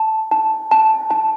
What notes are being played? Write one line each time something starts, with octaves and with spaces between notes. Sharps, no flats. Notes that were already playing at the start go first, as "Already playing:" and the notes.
Already playing: A5
A5
A5
A5